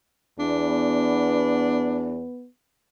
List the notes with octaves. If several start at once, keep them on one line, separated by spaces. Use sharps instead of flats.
E2 B3 D4